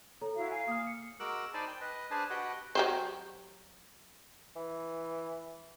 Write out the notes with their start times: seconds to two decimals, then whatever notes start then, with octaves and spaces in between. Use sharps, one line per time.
0.21 A4 C#5 A#5
0.35 E4 F#4 F5
0.51 F5 G#5
0.68 A#3 D#6 F6
0.85 C7 C#7
1.20 G#3 F#4 A#4 D6 E6 F#6
1.54 D#4 C5 D5 G#5 A5 B5
1.67 G5
1.81 B4 D#5
2.11 D4 G#4 B4 C5 G#5 A5
2.30 F#4 G4 B4 D#5 F#5 G5
2.75 F#3 G4 C5
4.56 E3